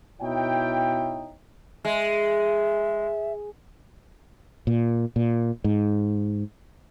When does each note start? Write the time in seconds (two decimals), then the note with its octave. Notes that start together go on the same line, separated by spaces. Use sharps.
0.21 B2 D#4 E4 C#5 G5
1.85 G#3 E5
4.67 A#2
5.16 A#2
5.64 G#2